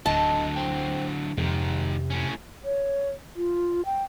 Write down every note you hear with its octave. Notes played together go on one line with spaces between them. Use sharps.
D1 D3 F#3 D#5 A5
C5 G5
F2 G#2 C3 D#3
A2 C#4
C#5
F4
G5